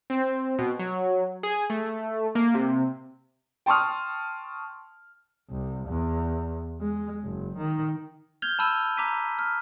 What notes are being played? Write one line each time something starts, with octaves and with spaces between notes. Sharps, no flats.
C4
B2
F#3
G#4
A3
A#3
C3
G5 A5 C6 C#6 D#6 F6
C2
E2
G#3
F#1
D#3
F6 G6 G#6 F7 G7
A5 B5 E6 D#7 F7
A#5 D6 B6 D#7
F6